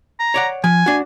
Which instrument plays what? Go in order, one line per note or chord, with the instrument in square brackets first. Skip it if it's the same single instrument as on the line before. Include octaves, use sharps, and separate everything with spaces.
[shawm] A#5
[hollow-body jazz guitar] C#5 D5 F#5
[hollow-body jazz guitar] F3 [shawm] G#5
[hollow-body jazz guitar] D4 F#4